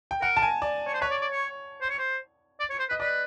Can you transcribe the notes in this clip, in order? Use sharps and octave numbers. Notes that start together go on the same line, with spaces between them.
G5
A#4 F#5
A5
G#5
D5
C#5
C5
B4 C#5
D5
D5
C#5
C5
C#5
C5
D5
C#5
C5
B4 D#5
B4 D5